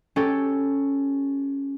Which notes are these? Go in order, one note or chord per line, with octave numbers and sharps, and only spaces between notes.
C#4 G4 A4